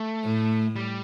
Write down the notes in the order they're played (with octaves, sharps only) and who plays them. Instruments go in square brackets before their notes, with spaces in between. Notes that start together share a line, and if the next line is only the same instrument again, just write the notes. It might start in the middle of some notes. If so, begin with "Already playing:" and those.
Already playing: [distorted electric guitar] A3
[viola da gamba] A2
[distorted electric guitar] G3